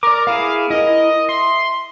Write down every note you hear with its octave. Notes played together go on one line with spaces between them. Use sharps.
A#4 D5 D6
B3 E4 G#4 F5
E4 A#4 D#5
E5 C6